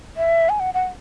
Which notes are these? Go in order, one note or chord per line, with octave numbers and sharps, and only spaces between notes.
E5
G#5
F#5
F#5